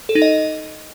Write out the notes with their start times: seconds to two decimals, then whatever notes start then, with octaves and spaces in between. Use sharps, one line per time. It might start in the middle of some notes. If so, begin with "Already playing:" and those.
0.09 A4
0.15 D#4
0.22 D#5